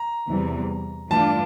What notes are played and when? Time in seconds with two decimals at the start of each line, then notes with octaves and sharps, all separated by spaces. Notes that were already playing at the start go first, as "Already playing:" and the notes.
Already playing: A#5
0.28 E2 C3 E3 G3
1.10 G2 E3 A3 D4 F4 A5